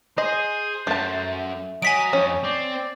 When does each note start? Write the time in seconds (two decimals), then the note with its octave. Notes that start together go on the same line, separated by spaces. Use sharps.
0.18 G#4 C5 D#5
0.87 F#2 A3 A5
1.82 F#3 D#5 G#5 B6 D7
2.13 F2 C#4
2.44 C4 D5